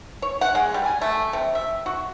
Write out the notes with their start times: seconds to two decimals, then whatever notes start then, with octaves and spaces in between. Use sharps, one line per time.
0.22 C#5
0.41 F#5
0.55 G#3
0.74 G3
0.86 G#5
1.02 A3
1.33 C3
1.55 E5
1.86 F#4